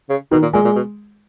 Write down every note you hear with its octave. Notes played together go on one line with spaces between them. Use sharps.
C#3
B2 D#3
A#2
A#2 G#3
A#2
B2